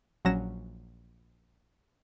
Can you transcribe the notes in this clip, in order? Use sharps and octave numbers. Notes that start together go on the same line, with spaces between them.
A#1 F#3 C#4 A#6 E7